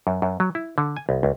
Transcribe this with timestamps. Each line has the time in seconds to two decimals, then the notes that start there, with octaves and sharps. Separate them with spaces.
0.07 F#2
0.22 F#2
0.40 F#3
0.55 E4
0.78 D3
0.97 G#5
1.09 C2
1.23 C#2